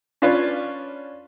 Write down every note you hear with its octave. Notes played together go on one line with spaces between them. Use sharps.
C#4 D4 F4 B4 C#5 D5